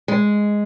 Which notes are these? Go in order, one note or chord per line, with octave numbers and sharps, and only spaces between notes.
G#3